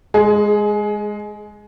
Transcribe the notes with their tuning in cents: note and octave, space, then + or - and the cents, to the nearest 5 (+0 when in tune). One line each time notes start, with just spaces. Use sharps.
G#3 +0 G#4 +25